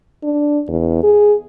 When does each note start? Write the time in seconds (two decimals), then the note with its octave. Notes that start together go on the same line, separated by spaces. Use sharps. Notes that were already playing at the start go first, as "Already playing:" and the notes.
0.23 D4
0.68 E2
1.03 G#4